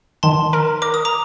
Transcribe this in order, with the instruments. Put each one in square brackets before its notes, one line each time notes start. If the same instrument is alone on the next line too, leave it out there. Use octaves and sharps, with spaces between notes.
[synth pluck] D#3 [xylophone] A5 C6
[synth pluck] A#4
[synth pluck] A#4 [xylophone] D6
[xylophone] D#6
A#5 D6